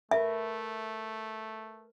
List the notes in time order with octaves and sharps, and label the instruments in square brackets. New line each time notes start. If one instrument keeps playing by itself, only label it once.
[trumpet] A3 [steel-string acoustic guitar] A#4 B4 [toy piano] E5